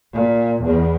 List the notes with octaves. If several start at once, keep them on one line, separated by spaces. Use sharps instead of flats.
A#2
E2